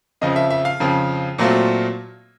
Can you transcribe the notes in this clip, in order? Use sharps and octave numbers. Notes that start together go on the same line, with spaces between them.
F2 C#3 F3 D#5
E5
E5
F5
F2 C#3 F3
A#2 F#3 A3 C4 F4